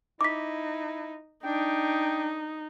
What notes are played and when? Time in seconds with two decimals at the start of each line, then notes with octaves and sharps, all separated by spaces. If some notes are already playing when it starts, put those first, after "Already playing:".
0.21 D#4 E4 D6 B6
1.44 D4 D#4 G5